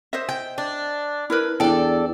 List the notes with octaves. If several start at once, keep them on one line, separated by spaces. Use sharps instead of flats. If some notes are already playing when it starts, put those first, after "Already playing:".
C5 D#5 E5
G5
D4
E4 A#4 B4
E2 D4 A4 D5 G5